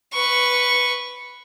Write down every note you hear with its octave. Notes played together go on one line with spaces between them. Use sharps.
B4 C#6